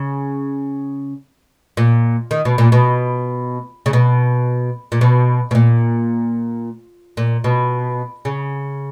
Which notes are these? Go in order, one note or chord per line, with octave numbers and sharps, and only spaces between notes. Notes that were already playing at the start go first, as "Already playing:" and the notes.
Already playing: C#3
A#2
D#3
B2
A#2
B2
C#3
B2
A#2
B2
B2
A#2
A#2
B2
C#3